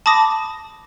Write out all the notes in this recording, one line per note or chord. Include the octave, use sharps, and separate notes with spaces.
A5 B5 D6 D#6 A#6